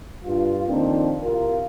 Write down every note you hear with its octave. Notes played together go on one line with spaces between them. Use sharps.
G2 F4
F2 D#3 A#3 C4 D4 F4
C2 F4 A#4